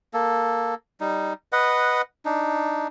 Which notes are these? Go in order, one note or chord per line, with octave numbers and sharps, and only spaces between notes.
A#3 A4
G3 D#4
B4 D#5 F#5
D4 D#4